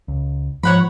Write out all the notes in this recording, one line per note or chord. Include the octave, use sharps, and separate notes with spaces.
C#2
G#2 F3 C#5 F#5 B5